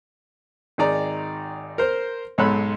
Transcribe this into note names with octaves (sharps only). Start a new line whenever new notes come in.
G#1 D#3 D#4 G#4 D5 A#5
A#4 C5
B1 G#2 A4 C#5 B5 F#6